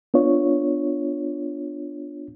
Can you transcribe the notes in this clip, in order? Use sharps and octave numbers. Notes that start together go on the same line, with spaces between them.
B3 D4 F4 C#5